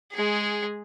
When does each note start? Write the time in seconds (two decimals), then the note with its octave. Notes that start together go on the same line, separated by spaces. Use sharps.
0.12 G#3 G#4